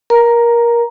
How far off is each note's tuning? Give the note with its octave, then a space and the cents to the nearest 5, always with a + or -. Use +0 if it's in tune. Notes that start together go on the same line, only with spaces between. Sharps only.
A#4 +20 A#5 +0